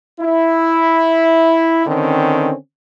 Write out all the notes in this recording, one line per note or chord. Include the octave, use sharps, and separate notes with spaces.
E4
D3 D#3 C4 C#4